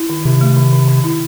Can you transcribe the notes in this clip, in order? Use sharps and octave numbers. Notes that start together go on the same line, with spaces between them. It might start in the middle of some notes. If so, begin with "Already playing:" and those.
Already playing: E4
D#3
C3 D#3
A3
D#3
D#3
D#3
E4